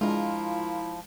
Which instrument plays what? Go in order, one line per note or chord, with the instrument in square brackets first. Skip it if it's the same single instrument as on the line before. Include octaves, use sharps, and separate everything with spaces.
[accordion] F3 [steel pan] G#3 D4 [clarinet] E4 [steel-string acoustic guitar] F4 A#4